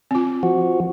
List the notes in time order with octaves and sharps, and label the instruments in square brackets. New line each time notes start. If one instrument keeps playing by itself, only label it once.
[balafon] C4 F4
[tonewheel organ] F3 F#4